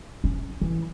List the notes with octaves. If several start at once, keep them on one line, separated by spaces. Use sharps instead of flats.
C#4
E3